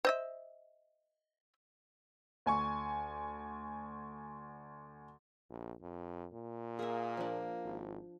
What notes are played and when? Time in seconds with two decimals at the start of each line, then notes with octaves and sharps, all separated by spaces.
0.05 C5 D#5 E5
2.46 D2 G#5 C#6
5.50 A#1
5.81 F2
6.33 A#2
6.79 A#3 G#4 E5
7.17 F3 D4
7.65 G#1